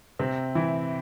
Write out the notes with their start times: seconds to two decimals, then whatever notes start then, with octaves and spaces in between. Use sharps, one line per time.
0.19 C3 C4
0.55 E3 E4